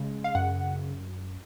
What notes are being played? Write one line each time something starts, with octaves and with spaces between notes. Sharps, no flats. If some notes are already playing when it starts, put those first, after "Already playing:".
Already playing: C#3 G#3
F5
F#2 F#5